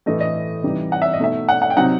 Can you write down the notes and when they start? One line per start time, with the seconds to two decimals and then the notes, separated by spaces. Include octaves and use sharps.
0.06 A2 E3 A3 D#5
0.20 D#5
0.63 C3 E3 G3 D#4
0.92 F#5
1.02 E5
1.13 D#5
1.19 B2 A3 D#4 E5
1.49 F#5
1.62 F#5
1.70 G5
1.77 C3 F#3 C4 D#4 F#5